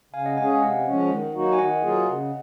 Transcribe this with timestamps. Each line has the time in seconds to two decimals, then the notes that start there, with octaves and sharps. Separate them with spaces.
0.13 C#3 F5 G#5
0.25 D#5 F#5
0.37 G#3 C#4 G#4 F5 G#5
0.49 F5 G#5
0.61 C3 D#5 F#5
0.86 F3 G#3 C#4
1.10 D#3
1.34 F#3 A#3 D#4 F#4
1.53 G#5
1.58 D#3 D#5 F#5
1.82 F#3 A#3 F4 G#4
2.07 C#3